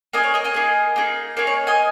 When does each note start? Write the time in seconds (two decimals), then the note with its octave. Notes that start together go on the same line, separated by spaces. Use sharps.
0.13 A#3 D#4 G#4 D#5 G#5
0.24 C#5
0.34 A#4 D#5
0.44 D#5 G#5
0.54 A#3 D#4 G#4
0.96 A#3 D#4 G#4
1.37 A#3 D#4 G#4 C#5
1.47 C#5
1.67 D#5 G#5